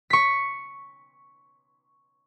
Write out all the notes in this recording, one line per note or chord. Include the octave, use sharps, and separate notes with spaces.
C#6 B6